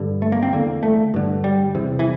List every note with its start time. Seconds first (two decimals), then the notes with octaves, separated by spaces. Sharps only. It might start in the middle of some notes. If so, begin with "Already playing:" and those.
Already playing: G2 D3
0.22 A3
0.32 A#3
0.43 C4
0.53 E2 D3 A#3
0.83 A3
1.14 G2 D3
1.44 G3
1.75 E2 C3
1.99 E3